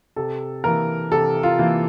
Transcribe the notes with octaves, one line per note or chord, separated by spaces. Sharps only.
C3 A4
E3 A#3 A#4
C3 A4
F4
E3 A#3